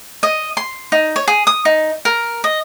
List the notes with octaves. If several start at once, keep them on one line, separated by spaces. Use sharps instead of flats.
D#5
C6
D#4
C#5
G#4
D#6
D#4
A#4
D#5